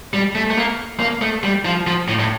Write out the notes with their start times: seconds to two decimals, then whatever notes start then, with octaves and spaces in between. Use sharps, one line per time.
0.13 G3
0.35 A3
0.51 A3
0.57 A#3
1.00 A#3
1.22 A3
1.43 G3
1.65 F3
1.87 F3
2.08 A2
2.19 A2